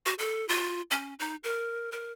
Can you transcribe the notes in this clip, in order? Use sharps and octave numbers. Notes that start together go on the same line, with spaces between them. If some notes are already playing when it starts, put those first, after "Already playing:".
F#4
A4
F4
C#4
D#4
A#4
A#4